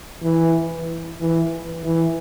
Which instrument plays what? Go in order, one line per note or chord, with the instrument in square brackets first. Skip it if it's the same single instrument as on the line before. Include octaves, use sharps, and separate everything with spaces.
[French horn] E3
E3
E3